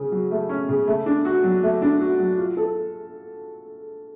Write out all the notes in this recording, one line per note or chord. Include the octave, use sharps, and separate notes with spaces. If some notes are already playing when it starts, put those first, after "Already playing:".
Already playing: C#3 C#4
F#3
A3
C#4
C#3
A3
D4
F#4
F#3
A3
D4
F#4
F#3
F4
A4